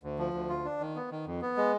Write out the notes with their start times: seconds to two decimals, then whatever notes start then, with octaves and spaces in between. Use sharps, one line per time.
0.03 D2
0.18 F3
0.34 D2
0.49 F4
0.65 D4
0.80 D#3
0.96 B3
1.11 D#3
1.26 F2
1.41 B3
1.57 G#3